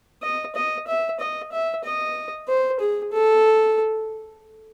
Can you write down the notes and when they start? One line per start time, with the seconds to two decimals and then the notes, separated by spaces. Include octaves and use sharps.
0.23 D#5
0.55 D#5
0.87 E5
1.20 D#5
1.52 E5
1.85 D#5
2.48 C5
2.80 G#4
3.12 A4